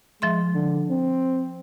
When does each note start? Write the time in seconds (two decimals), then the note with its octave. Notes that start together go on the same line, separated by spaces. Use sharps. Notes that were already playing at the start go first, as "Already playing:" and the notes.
0.22 F3 G#3 E5 C6
0.55 D3
0.90 C4